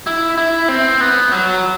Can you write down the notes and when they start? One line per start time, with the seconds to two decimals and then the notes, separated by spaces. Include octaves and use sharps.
0.07 E4
0.38 E4
0.69 C4
1.01 B3
1.32 F#3